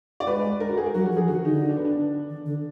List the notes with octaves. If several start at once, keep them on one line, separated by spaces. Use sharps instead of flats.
D5
G#3 B4
A#4
F#4
G#4
A#4
F#3 F#4
F#4
F3
G#4
D#3 F#4
D3 D#4
D#4
D4
B3
D4
D#3
D3